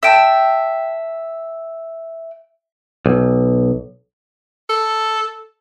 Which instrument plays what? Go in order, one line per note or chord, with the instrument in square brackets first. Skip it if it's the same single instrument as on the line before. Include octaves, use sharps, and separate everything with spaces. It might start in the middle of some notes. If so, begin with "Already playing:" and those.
[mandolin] E5 G5 A5
[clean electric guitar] B1
[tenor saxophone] A4